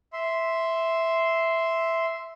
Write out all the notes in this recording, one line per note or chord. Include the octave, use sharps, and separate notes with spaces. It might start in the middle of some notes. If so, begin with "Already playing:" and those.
E5 C6